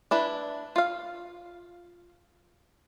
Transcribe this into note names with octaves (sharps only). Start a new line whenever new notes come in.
D4 E4 B4
F4 F5